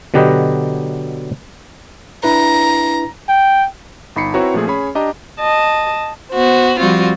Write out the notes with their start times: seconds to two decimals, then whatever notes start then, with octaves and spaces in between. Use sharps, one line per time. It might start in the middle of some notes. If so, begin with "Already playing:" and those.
0.14 B2 D3 F#3 G4 B4 D#5
2.24 D4 E4 B4 A#5
3.29 G5
4.16 G1 D#4 B5 C7 C#7
4.34 C4 E4 F#4 B4 C#5 A#5
4.54 A#2 F3 A3 G#4
4.67 C#4 G#4 C#5 B5
4.95 D4 G4 D#5 A#5
5.40 D#5 A5
6.31 B3 F#4 C5
6.78 F3 G3 C4 F4 F#4